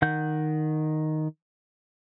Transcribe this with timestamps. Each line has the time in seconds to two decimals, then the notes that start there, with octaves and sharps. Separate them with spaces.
0.02 D#3 F#5 G6